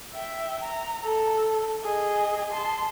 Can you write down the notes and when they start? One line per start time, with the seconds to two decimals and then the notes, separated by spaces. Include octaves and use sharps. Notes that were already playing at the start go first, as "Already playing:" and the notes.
0.14 E5 G5
0.63 A#5
1.04 A4
1.84 G#4 D#5
2.52 A5 C6